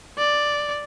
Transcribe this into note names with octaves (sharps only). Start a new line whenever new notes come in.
D5